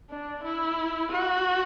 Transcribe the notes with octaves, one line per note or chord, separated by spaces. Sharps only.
D4
E4
F#4